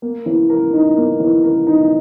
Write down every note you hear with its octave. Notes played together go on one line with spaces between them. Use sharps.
A#3
E3
A#4
D#4
A#3
E3
A#4
D#4